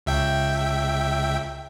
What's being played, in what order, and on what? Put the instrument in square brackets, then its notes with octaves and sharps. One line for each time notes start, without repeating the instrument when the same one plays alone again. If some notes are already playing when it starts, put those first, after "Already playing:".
[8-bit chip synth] C#2 E5 G5